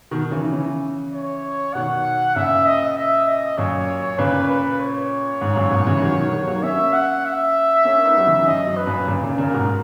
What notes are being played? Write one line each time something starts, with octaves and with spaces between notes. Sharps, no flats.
B2 D#3
C#3 E3
C#3 E3
C#5
B2 D#3 F#5
A#2 C#3 E5
D#5
E5
D#5
F#2 A#2 C#5
A#2 C#3 B4
B4
C#5
G#2
F#2 A#2
G#2 B2
C#3 E3
D#3 F#3
B2 D#3
D#3 F#3
F#3 A#3
A#3 C#4 E5
F#5
E5
A#3 C#4
B3 D#4
F#3
C#3 E3
F#2 D#5
F#2
B4
F#2 A#2
A#2 C#3
A#2 C#3
A#2 C#3 A#4
G#2 B2